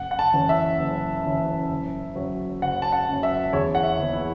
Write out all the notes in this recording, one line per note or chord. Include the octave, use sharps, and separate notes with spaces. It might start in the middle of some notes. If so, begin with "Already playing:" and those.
Already playing: F#1 F#5
F#5
A5
F#2 E3 C#4
E5
F#1
F#2 E3 C#4
F#1
F#2 F#3
F#1 F#5
A5
F#5
F#2 F#3
E5
E2 C#5
F#5
E5
E3 B3
E4